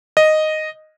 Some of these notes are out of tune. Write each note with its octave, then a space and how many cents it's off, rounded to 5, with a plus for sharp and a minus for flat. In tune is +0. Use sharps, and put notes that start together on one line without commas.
D#5 -5